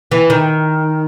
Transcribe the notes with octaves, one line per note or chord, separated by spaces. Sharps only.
E3
D#3